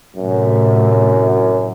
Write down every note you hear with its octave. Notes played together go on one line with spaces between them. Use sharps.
F#2 A2 C3